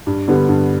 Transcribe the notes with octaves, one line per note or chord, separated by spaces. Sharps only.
G2
D3 G3 B3
G2